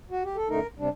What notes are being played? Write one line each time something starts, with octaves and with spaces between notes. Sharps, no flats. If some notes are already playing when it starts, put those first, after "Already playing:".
F#4
G4
A4
F#2 D3 A3 D#4 A#4
C3 G3 D4